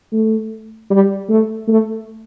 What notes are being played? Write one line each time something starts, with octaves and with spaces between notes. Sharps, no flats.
A3
G3
A3
A3